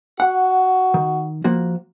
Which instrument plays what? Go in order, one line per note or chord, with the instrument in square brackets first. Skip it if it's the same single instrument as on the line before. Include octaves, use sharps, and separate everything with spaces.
[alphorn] F#4 [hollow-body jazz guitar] F#5
[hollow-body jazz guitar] D#3
F3 A#3 F#4